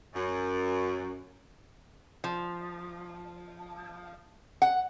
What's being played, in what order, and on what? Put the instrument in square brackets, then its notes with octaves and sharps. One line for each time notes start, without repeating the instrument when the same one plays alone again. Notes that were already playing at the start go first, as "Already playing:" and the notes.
[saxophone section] F#2
[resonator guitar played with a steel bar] F3
F#5